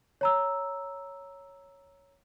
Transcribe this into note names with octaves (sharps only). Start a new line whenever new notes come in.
C#5 A#5 E6